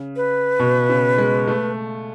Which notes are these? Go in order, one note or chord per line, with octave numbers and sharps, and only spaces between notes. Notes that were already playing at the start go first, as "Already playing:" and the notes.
Already playing: C#3
B4
B2
C#3
G#3
A3